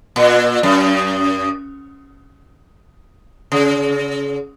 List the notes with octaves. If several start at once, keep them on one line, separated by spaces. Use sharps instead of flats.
A#2
F#2
C#3